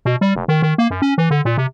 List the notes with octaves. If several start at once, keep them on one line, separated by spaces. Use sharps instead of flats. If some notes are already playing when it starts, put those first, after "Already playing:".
B2
G3
F1
D#3
D#3
A#3
F#2
C#4
E3
D3
A#2
C3